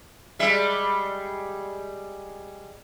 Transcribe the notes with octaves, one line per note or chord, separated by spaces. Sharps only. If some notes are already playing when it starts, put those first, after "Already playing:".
G3 G#3 E5